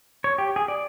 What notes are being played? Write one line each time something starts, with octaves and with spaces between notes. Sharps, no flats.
C#5
G4
G#4
D5